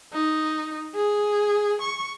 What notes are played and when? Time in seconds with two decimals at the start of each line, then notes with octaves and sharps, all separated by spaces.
0.13 D#4
0.95 G#4
1.81 C#6